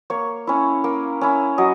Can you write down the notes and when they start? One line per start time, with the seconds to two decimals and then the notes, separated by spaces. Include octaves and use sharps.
0.10 A#3 C#5
0.47 C#4 E4
0.84 A#3
1.21 C#4 E4
1.58 F#3 D#5